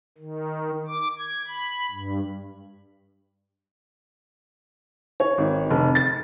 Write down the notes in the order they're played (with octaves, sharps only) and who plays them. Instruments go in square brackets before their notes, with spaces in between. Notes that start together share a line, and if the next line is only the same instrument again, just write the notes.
[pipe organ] D#3
D6
G#6
B5
G2
[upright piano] C#5
G#1
F1
A6